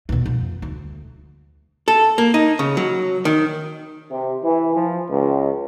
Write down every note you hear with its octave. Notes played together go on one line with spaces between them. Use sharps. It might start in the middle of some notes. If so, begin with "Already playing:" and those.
D#2 B2
F2
D2
A4
A#3
D#4
C#3
F#3
D#3
C3
E3
F3
C#2